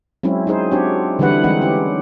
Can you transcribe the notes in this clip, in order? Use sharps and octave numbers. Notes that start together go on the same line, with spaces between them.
F#3 G#3 C4 C#4 E4
D#4 E4 G#4 C5
C4 D4 F#4 G4 C#5
D3 E3 G3 E4 B4 F#5
E3 G#3 C4 D#4 F#5
C#4 G4